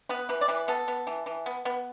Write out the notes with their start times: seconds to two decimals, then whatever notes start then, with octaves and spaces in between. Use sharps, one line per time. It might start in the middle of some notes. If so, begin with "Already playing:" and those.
0.09 B3 B4
0.29 E3 B4
0.41 D5
0.48 E3 B4
0.68 B3 A4
0.88 B3
1.07 E3
1.26 E3
1.46 B3
1.65 B3